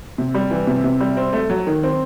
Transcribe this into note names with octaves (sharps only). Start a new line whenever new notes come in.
C3
G3
E3
C3
C3
G3
C4
A3
F#3
D#3
C4